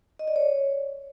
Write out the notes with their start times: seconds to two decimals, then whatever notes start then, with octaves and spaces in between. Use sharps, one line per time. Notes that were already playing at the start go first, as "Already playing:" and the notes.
0.19 D#5
0.28 D5
0.36 C#5